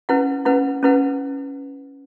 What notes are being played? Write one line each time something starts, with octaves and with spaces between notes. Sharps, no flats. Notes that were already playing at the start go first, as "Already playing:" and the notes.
C#4 E4 B4 F#5
C#4 E4 B4 F#5
C#4 E4 B4 F#5